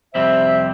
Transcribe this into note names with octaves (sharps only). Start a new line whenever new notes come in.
F2 C3 G3 C4 C5 E5